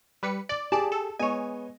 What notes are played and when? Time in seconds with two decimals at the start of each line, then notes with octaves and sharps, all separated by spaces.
0.23 G3 B4 C#7
0.49 D5 F#7
0.72 G4 G#4 D5 G#5 A5
0.92 A4
1.19 G#3 B3 C#5 D#5 G#5